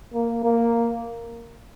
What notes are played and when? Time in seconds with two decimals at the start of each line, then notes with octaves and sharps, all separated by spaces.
0.14 A#3
0.44 A#3